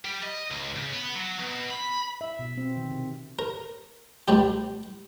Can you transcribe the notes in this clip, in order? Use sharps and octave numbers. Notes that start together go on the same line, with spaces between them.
G3
D#5
C#2
C#3
B3
F#3
B2
B5
E5
B2
C4
D#3
C3
A#4
C#2 B2 G3 G4